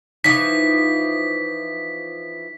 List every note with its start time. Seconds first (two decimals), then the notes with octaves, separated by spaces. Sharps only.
0.24 E3 F3 D#4 B6